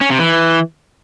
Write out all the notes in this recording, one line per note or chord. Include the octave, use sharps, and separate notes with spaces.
C#4
C3
E3